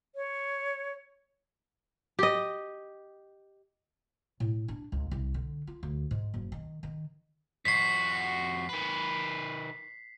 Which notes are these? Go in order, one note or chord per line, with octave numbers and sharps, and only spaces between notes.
C#5
G4 D#5
A2
D4
C#2
C2
D3
F4
D2
G#2
F#1
D#3
D#3
F2 F#4 B6 C7
D#3 B4